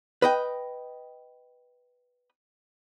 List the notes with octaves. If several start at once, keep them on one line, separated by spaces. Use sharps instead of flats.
B4 D#5 G5